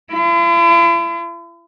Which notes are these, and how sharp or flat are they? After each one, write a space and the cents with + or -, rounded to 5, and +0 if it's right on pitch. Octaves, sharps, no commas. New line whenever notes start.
E4 +45